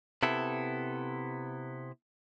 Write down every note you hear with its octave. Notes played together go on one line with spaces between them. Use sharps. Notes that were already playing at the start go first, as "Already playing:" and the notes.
C3 B3 E4 A4